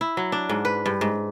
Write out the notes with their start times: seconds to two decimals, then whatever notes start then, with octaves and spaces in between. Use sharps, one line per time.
0.01 E4
0.17 F#3
0.32 D4
0.49 G#2
0.65 B4
0.86 G2
1.01 G#2